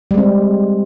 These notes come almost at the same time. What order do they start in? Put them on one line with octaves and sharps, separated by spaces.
G3 G#3 C4